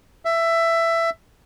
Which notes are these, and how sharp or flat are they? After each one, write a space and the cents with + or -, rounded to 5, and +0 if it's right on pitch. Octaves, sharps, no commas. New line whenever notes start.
E5 +15